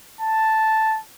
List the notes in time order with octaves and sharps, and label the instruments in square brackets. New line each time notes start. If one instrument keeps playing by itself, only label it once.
[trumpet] A5